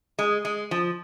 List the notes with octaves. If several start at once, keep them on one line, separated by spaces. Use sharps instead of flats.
G#3
G#3
F3